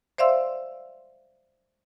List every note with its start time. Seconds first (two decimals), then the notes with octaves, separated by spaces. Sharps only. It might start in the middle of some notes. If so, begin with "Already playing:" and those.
0.18 C5 D5 E5 F5 C6 E6